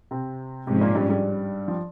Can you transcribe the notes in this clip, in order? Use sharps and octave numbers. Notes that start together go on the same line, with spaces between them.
C3 C4
G#2 C3 F3 G#3 C4 C#4
A#2 A#3
G2 G3
G2 G3
F3